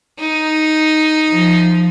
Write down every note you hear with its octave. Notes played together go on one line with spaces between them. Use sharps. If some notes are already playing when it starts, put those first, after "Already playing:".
D#4
F3